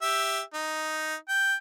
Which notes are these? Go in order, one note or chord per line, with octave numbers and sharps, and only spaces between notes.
G4 E5
D#4
G5